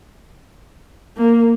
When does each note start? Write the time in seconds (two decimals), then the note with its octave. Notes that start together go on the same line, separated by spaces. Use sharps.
1.17 A#3